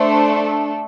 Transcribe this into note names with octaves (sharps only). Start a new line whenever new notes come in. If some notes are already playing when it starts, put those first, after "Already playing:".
Already playing: A3 D4 A4 C5